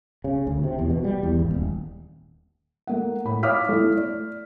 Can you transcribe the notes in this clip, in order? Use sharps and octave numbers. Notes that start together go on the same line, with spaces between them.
C#3
D2
C3
E2
B2
G3
E2
G#1
D#1
A3 A#3 F#5
A2 B5
C#5 F5 D6 D#6 F6 B6
A3 E4
D5